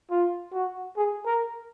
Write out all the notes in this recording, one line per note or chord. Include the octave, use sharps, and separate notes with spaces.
F4
F#4
G#4
A#4